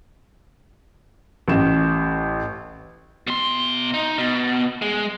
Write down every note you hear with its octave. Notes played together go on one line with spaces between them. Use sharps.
A1 A2 E7
B2 C6
D#4
B2
G#3